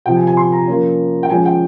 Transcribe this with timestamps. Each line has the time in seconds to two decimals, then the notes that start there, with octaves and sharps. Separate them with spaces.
0.06 C3 F3 C4 G5
0.16 G#5
0.27 G#5
0.37 C6
0.52 A#5
0.68 F3 A#3 C#4
1.23 G5
1.30 F3 G#3 C#4 G#5
1.46 G5